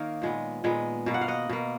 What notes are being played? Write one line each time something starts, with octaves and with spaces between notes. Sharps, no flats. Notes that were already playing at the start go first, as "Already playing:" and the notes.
Already playing: D#3 A#3 C#5 D#5 F5
A#2 G#3 B3
A#2 G#3 B3
B2 A#3
F#5
F5
D#5 F#5
B2 A#3